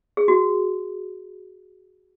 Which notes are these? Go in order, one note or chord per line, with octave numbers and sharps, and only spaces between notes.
G#4
F#4